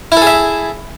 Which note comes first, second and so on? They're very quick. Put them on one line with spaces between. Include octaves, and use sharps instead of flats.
E4 A4 G#4 E5